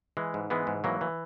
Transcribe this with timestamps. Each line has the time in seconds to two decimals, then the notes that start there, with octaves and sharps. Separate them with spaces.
0.17 E3 G#3
0.34 G#2
0.50 E3 G#3 B3
0.67 G#2
0.84 E3 F#3 A#3
1.01 E3